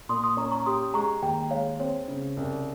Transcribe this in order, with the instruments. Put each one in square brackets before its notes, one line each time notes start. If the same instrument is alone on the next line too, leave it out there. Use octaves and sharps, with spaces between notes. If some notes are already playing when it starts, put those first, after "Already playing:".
[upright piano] A#2 [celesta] C6 D#6
[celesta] C6 D#6
[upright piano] C#4 [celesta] A#5 C#6
[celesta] A#5 C#6
[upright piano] G4 [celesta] C6 D#6
[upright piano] G#3 [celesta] A#5 C#6
[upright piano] D#2 [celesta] G5 A#5
[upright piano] G#3 [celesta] C#5 F5
[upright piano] C4 [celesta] C#5
[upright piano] C#3
C2